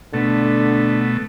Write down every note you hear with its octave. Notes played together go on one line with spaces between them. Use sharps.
B2 D3 A3